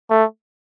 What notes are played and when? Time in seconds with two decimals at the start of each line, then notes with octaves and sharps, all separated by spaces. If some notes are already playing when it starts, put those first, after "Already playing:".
0.10 A3